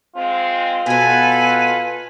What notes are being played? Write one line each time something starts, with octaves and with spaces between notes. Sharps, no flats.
G#3 C4 F4
B2 B3 A4 B4 G#5